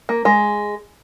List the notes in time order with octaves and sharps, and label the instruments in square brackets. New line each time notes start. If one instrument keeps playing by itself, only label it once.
[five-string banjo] A#3
G#3